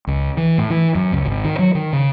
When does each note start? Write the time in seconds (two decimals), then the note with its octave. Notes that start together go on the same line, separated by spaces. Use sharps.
0.07 C#2
0.37 E3
0.58 A2
0.70 E3
0.95 F#2
1.13 C#2
1.25 G#1
1.44 D#3
1.59 F#3
1.75 D#3
1.93 C#3